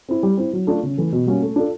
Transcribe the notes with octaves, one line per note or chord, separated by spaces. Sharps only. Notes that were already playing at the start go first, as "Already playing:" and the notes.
C4 E4
G3
C4 E4
F#3
A3 D4 F4
C#3
E3 A3
B2
G3 A#3 C#4 F#4
A3
D4 F4 A4